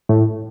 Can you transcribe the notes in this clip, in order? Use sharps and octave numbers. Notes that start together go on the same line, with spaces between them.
A2